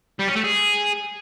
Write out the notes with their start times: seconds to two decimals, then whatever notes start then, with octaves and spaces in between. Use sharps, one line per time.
0.20 G3
0.28 C#4
0.36 A3
0.44 G#4